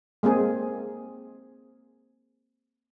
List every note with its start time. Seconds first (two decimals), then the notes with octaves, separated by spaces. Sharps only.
0.23 G#3 A#3 C4 G#4